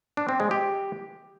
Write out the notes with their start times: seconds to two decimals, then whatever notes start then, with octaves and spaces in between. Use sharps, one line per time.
0.17 D4
0.29 C4
0.40 G#3
0.51 G4